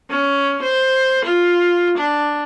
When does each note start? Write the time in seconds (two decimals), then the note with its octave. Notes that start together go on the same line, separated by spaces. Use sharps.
0.10 C#4
0.63 C5
1.25 F4
1.97 D4